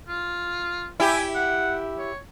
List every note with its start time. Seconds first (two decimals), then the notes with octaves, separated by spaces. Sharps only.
0.09 F4
1.00 E4 G4 G#5
1.35 F#5
1.98 C#5